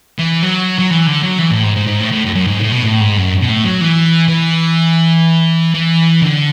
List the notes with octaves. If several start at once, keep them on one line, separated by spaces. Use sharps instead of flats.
E3
F#3
F#3
E3
D3
F#3
E3
A2
G#2
G#2
G#2
A2
A2
F#2
F#2
G#2
A2
B2
A2
G#2
F#2
B2
A2
F#3
E3
E3
E3
D3